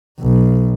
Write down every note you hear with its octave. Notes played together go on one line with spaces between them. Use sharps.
B1